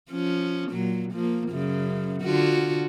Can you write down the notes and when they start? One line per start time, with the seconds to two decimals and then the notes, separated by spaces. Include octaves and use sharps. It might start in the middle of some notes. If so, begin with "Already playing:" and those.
0.11 F3 C#4
0.70 A#2 F#3
1.12 F3 A#3
1.49 F#2 C#3
2.23 D3 F4 F#4